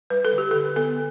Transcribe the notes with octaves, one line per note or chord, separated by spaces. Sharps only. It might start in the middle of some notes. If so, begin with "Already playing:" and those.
G3 B4
A4
D3
G4
D3 A4
B3 A4